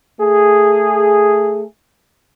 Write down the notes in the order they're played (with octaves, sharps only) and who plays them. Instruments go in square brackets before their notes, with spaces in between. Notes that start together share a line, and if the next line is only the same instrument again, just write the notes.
[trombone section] A3 G#4